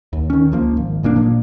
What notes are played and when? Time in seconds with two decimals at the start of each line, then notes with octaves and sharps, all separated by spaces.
0.13 D#2
0.30 D#3 C#4
0.52 C#2 F3 A#3
0.77 G#1
1.03 G1 A#2 A#3 D4
1.16 A#2 F3 A#3